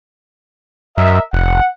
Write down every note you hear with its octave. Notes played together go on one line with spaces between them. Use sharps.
F#2 A#4 D#5 E5
F1 F#5